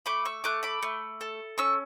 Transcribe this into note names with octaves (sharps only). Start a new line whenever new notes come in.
A3 B5 D6
C#6 E6
A3 D6 F#6
B5 D6
A3
A4
C#4 C#6 E6